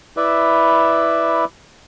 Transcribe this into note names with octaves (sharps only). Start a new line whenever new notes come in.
E4 B4 D5 E5